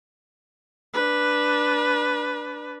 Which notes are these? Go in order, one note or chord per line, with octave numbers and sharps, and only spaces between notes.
D4 B4